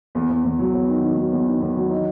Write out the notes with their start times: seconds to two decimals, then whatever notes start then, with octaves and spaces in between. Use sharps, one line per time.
0.15 E2
0.29 E2
0.44 E2
0.59 F#3
0.73 E2
0.88 D#3
1.03 D#3
1.17 F#3
1.32 E2
1.47 D#3
1.62 E2
1.76 F#3
1.90 D#4